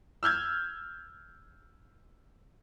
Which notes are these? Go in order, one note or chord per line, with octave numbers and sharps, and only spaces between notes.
E6 F6 G6 G#6